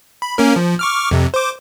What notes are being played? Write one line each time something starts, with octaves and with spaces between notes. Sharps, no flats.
B5
A#3 C#4 A#4
F3
C#6 D6 F6
F2 C3
C5 D6